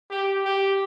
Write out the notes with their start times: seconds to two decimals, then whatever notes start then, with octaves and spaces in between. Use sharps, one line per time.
0.10 G4
0.45 G4